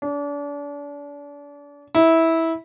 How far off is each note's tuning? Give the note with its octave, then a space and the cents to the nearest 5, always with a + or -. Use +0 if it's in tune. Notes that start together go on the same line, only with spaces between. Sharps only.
D4 -35
E4 -15